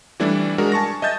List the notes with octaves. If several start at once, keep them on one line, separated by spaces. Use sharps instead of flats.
E3 G3 A3 D4 E4
G#3 D4 F#4 A#4
G#5 A5 C#6 A#6
D#5 E5 G6 A6